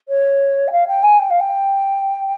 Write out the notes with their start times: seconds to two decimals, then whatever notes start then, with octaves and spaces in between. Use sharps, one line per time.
0.08 C#5
0.67 G5
0.72 F5
0.87 G5
1.03 G#5
1.19 G5
1.30 F5
1.40 G5